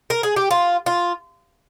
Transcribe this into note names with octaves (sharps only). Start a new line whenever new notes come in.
A#4
G#4
G4
F4
F4